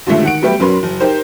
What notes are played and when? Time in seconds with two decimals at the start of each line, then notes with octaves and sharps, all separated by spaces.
0.07 D#2 A#2 D3 F3 G#3 A3
0.23 D#3 F#5 D7
0.42 F#3 G3 A3 B3 G4
0.60 B1 F#2 C#4 A#4 B4 C6
0.83 F#1
1.00 D#4 G4 A#4 C5